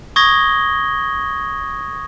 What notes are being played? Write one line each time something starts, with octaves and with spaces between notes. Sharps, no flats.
C#6 D#6 G#6 A#6 G7